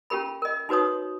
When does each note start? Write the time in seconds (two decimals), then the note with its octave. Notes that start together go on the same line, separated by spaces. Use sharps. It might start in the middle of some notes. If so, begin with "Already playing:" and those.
0.10 C#4 F4 G4 A#4 B5
0.42 A#4 D#5
0.69 D#4 F#4 B4 C#5 D#6